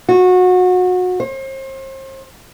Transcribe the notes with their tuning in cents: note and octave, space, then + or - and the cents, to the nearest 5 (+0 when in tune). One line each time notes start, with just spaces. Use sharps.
F#4 -25
C5 +40